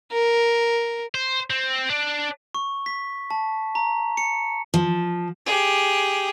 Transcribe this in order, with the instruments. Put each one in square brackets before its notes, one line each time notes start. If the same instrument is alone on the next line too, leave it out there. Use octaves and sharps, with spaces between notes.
[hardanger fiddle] A#4
[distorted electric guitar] C5
C4
D4
[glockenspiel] C#6
B6
A5
A#5
C#7
[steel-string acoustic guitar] F3
[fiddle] G4 G#4